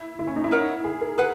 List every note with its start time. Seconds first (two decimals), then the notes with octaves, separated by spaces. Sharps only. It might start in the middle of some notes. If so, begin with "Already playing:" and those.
Already playing: E4
0.19 E4
0.27 C#4
0.36 D#4
0.44 E4
0.51 D#4 A#4 C#5 F#5
0.84 G#4
1.01 A#4
1.18 G#4 A#4 B4 F#5